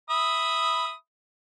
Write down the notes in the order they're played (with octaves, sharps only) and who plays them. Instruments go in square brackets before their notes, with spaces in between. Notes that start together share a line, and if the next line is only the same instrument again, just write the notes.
[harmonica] E5 B5 D#6